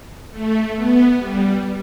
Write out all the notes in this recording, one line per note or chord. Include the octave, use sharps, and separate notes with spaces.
A3
B3
G3